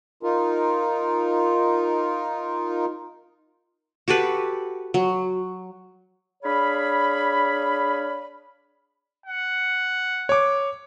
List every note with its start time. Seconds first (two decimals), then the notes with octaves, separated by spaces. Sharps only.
0.23 D#4 F4 A#4
4.08 F#4 G4 A4 B4
4.94 F#3
6.43 D4 G#4 C#5 F5 B5
9.26 F#5
10.29 C#5 D6